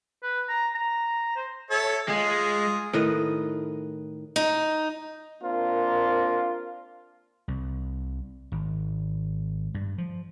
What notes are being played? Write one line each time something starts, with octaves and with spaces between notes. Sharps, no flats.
B4
A#5
A#5
C5
A4 C#5 E5
G#3 F4 G#4
A2 D#3 B4 D#5
D#4
A#3 C4 D4 F4 A#4
C2
G#1
G2
F3